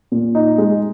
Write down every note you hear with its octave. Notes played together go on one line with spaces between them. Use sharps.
A#2
D#4
G#3